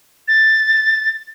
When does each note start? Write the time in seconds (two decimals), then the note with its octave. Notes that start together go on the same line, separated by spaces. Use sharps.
0.28 A6